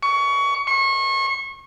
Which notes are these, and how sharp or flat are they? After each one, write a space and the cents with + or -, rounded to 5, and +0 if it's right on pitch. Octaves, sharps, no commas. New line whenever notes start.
C#6 +25
C#6 -30